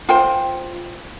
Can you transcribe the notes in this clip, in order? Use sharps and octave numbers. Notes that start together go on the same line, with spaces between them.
F4 C5 G5